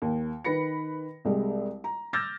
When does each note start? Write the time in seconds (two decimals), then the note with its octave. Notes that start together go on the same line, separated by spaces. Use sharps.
0.02 D#2
0.44 D#3 B4 B5 A#6 C#7
1.25 C2 G3 G#3
1.84 A#5
2.13 D6 E6 F6 G6 A6 A#6